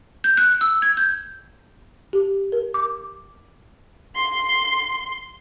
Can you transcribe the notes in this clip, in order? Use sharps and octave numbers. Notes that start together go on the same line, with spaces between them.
G6
F#6
E6
G#6
G6
G4
A#4
D6
C6